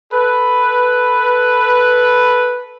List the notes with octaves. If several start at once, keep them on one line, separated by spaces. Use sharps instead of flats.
A4 B4